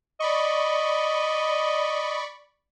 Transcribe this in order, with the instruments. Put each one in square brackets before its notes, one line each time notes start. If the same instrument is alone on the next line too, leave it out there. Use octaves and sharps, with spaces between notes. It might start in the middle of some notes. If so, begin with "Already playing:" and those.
[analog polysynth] D5 B5 C#6 [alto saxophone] D#5